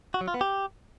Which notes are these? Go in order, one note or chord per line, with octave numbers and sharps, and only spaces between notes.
F#4
F#3
F4
B3
G4